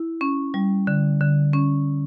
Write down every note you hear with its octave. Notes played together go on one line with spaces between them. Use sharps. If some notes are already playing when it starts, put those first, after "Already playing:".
Already playing: E4
C#4
G3
D3
D3
C#4